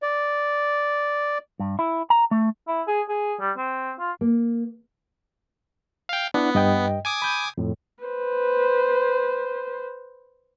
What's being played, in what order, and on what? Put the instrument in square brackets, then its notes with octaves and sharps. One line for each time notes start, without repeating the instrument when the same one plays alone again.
[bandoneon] D5
[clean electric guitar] G2
E4
A#5
A3
[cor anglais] E4
G#4
G#4
G3
C4
F4
[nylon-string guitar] A#3
[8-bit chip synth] F5 G5
[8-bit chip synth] B3 [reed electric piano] D4 E4 F#5
[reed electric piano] G2 D#5 G5
[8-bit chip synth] G#5 D6 D#6
[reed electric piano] B5 G6
F2 A2
[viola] B4 C5